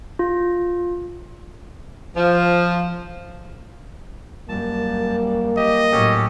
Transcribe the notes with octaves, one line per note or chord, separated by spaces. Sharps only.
F4
F3
F#2 G3 A#3 A5
G4 D#5
A2 F#3 C#4 G4 A4